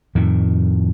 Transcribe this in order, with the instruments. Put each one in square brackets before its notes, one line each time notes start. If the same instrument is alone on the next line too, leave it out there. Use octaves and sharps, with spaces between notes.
[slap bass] F2 A2 D#3